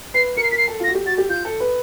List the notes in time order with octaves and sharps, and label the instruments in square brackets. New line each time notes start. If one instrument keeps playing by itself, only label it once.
[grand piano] B4 [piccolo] C7
[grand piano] A#4 [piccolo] C#7
[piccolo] C7
[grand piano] A#4 [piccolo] B6
[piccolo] C7
[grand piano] A4
F4
[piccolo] A#6
[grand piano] F#4
G4
[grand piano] F#4 [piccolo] A6
[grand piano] G4
[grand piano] F4 [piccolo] G6
[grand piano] A4
B4